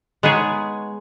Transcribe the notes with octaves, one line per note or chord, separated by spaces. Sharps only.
G#3 B3 D#4 G#4 C#5